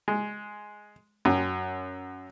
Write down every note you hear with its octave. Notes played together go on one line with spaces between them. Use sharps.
G#3
F#2